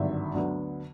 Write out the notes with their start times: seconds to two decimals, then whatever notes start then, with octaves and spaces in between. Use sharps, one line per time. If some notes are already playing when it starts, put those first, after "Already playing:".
Already playing: G#1 G2 D3 F#3 E5
0.34 D2 D3 F#3 B3